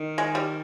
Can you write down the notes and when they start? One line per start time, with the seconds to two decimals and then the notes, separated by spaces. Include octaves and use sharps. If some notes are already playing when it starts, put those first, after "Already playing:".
Already playing: D#3
0.18 G#3
0.35 G3